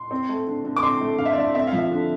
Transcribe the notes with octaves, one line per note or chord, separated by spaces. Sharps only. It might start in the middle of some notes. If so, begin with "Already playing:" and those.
Already playing: C6
C4
A3
D3
D3
D6
C4 C6
A3
D3 F5
E5
D5
D3 E5
C4 E5
F5
F3
E5
D3